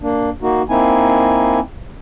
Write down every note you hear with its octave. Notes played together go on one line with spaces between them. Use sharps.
A#3 D4
A#3 D#4 F#4
A#3 C4 D#4 E4 G#5